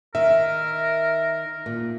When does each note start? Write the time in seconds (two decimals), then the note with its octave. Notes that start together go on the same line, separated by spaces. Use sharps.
0.15 D#3 A#4 E5
1.66 A#2